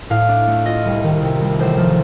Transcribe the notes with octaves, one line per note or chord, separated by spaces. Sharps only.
A2 F5
D4
A3
F4 D#5
C2
D#3
C3
C2
A1 C5
F3